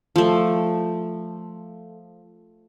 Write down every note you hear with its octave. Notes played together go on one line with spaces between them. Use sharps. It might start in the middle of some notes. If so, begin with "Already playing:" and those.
F3 A3